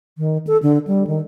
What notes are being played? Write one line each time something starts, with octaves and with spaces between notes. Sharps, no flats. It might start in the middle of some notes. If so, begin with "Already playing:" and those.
D#3
A4
D3
G3
D#3